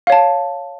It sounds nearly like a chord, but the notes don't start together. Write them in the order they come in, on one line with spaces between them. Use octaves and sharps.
F5 C#5 A5